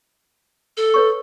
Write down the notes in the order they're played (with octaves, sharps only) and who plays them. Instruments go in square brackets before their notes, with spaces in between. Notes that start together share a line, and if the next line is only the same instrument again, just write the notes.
[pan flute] A4
[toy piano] B4 C#5 C#6